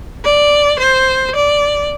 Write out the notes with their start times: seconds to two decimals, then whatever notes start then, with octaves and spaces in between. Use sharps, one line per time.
0.24 D5
0.79 C5
1.35 D5